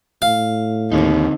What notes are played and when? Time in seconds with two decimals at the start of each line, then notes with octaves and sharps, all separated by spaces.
0.22 A2 F5
0.92 D#2 D3 C4 D#4